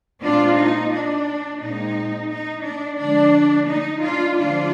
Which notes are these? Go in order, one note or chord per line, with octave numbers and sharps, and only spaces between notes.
A#2 G#3 C4 D4 F4
D#4
D4
A#2 G#3 C4 D#4
D#4
D4
D3 F3 G#3 D4
D#4
D4 F4
D3 F3 G#3 C4 D4 F4